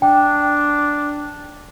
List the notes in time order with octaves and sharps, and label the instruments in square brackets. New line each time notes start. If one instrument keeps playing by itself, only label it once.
[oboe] D4 [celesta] G5